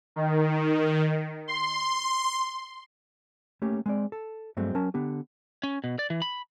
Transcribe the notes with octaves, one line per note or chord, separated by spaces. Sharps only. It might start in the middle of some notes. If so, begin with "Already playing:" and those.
D#3
C6
A3 A#3 C#4 G4
G#3 C4 D5
A4
G2 F#3 G#3 A3 C4
F#3 C#4 A#4 A5
D3 B3 G4
C#4
B2
D5
E3
B5